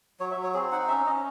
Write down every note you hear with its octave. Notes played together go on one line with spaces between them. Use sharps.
F#3 C#5
E5
F#3
C#5
C4 G#4
D#4 F#5
C#4 E5
C#4 D#5